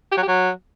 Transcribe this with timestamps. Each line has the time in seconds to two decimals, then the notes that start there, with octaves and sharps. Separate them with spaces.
0.12 G4
0.17 F#3
0.23 G4
0.28 F#3